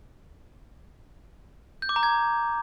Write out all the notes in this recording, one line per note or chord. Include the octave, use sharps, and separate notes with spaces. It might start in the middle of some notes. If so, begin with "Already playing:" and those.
G6
D6
A#5
G#6